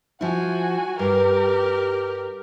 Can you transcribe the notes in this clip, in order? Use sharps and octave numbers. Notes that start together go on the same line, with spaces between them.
F3 E4 F#4 G#5
G2 G4 A#4